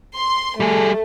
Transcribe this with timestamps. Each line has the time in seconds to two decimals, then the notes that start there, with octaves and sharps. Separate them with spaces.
0.19 C6
0.60 G3 A3 G#4